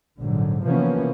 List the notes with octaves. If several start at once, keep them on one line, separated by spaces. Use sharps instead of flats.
A#1 G#2 D3 F#3
C3 E3 F3 A#3 B3 C#4